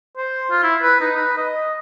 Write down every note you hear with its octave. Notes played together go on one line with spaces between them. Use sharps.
C5
F4
E4
B4
D#4
B4
D#5